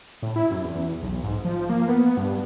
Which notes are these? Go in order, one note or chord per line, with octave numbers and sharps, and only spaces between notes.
A2
E4
F#2
E2
B1
G#2
F3
A#3
B3
G2